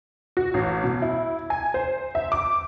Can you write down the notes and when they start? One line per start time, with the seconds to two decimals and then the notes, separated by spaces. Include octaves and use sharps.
0.37 F#4
0.54 A1
0.84 B2
1.02 E4
1.50 G#5
1.74 C5
2.15 E5
2.32 D6